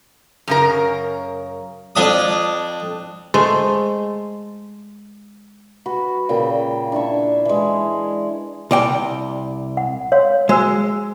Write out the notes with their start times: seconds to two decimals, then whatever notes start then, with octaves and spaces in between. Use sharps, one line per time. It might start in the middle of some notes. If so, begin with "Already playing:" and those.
0.48 F#2 C#3 A#4
1.96 F2 D4 D#6
3.34 G#3 A3 C5
5.86 F#4 B4
6.29 A#2 C#3 G5 B5
6.92 D4 E4 E5 C#6
7.45 E3 G#3
8.71 C2 D5 G5
9.77 F#5
10.12 C#5 F5 C6
10.49 G#3 F#4 C5 E6